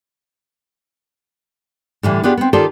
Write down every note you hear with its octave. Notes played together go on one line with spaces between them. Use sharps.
A2 D3 E3 G3
B3 D4 F4 G4 G#4
B3 C4
D#3 F4 G4 A4 C5 D5